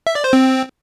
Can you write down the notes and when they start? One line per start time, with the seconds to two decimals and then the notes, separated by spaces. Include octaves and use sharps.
0.07 E5
0.15 D5
0.24 C5
0.33 C4